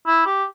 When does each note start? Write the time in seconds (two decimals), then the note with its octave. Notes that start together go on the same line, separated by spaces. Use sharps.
0.06 E4
0.26 G4